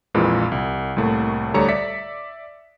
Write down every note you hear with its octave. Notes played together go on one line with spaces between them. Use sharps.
A#1 F2 A#2 E3 G#3
C2
C2 A2 A3 A#3
D2 G3 A4 C#5 A#5 C#7
D5 E5 B6 C#7